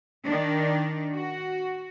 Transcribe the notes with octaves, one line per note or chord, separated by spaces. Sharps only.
D#3 D4
F#4